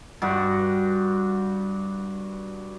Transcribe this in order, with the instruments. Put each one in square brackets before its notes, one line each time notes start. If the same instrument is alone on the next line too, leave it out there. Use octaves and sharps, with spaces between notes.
[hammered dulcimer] G2 F#4